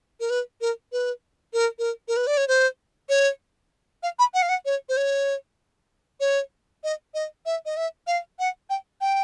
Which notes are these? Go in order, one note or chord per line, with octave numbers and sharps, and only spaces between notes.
A#4
B4
A#4
B4
A#4
A#4
A#4
B4
D5
C#5
C5
C#5
F5
B5
F#5
F5
F#5
C#5
C5
C#5
C#5
D#5
D#5
E5
D#5
E5
F5
F#5
G5
G5